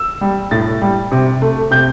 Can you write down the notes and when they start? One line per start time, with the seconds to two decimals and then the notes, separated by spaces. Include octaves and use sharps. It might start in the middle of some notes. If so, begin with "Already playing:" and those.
Already playing: E6
0.21 G3
0.51 A2 A6
0.82 G3
1.12 C3
1.42 A3
1.71 C3 G6